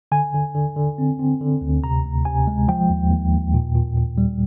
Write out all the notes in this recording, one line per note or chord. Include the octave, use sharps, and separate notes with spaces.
D3 G#5
D3
D3
D3
C4
C4
D3
D2
C3 A#5
D2
C3 G#5
G#3
F3 G5
D#2
D#2
D#2
A#2
A#2
A#2
G3